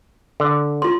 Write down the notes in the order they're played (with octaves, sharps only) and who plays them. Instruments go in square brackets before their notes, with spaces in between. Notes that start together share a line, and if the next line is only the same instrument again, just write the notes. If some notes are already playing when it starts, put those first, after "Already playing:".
[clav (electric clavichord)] D3
[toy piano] F4 C6